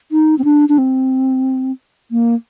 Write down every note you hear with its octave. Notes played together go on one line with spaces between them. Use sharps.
D#4
C4
D4
D4
C4
A#3